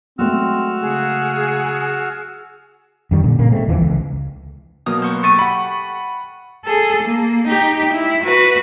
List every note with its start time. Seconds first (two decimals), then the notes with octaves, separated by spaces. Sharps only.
0.19 F#3 G#3 A3 C4 F#4 E6 F6
0.81 C#3 G#4 F#5
3.11 F#2 D#3 G3
3.24 A#2 D3
3.39 A#2 C#3 A#3
3.52 G#3 A3 C4
3.69 E2 D3 E3 F3
3.81 C#2
4.86 B2 F#3 A#3 D#6 F6
5.02 B3 F#4 C5
5.23 A3 G4 C#6 D#6 A6 D#7
5.39 F#5 B5
6.65 G#4 A4
7.03 A#3
7.48 D#4 G4
7.93 E4
8.24 F#4 B4